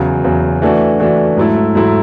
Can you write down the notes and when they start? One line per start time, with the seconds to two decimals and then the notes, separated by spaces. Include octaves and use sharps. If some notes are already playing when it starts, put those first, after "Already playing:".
Already playing: E2 C#3 F#3
0.24 E2 C#3 F#3
0.62 E3 A3 D4 F#4
1.00 E3 A3 D4 F#4
1.37 G#2 F#3 A3 E4
1.75 G#2 F#3 A3 E4